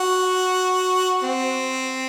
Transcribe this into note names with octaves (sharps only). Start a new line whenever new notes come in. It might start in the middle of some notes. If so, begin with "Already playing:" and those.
Already playing: F#4
C4